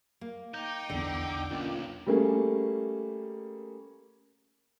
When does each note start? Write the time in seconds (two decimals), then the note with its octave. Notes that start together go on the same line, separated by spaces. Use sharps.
0.21 A#3
0.54 D#4 G5 D6 G6
0.90 A#1 E2 D3
1.51 B1 A#3 C#4 F4
2.06 G3 A3 A#3 C#4 G#4